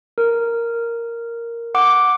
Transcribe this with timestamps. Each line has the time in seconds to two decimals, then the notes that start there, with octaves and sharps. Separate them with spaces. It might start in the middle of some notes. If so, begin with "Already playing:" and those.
0.18 A#4
1.75 F#5 D6